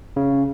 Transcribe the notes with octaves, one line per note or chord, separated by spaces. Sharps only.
C#3